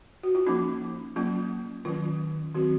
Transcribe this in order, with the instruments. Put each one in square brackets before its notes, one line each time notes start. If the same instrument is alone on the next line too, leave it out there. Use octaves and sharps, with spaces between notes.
[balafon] F#4
F4
F3 A#3 C#4 D#4
F#3 A#3 C#4 F4
D#3 F#3 C#4 F4
D#3 F#3 C4 F#4